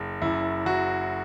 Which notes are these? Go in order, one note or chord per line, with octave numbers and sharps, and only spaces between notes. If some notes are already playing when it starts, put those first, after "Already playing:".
Already playing: F#1
F#2 E4
F#3 F#4